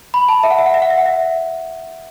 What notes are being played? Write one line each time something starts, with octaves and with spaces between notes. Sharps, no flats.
B5
A5
E5
F#5
E5
F#5
E5
F#5
E5
F#5
E5